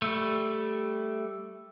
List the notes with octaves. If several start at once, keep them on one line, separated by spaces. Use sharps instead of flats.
G3 A3